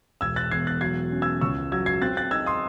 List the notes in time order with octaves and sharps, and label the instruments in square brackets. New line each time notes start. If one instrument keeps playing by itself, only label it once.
[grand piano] E1 E6 G#6
F#6 A6
E2 G#6 C7
F#6 A6
F#3 G#6 C7
C#4
E6 G#6
C#2 C#6 E6
F#3 E6 G#6
G#6 C7
C4 F#6 A6
F#6 A6
D#4 E6 G#6
C6 D#6